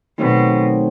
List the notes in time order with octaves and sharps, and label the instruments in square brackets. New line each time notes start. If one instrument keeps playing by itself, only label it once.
[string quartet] B2 [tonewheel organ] D#3 F#3 A3 C4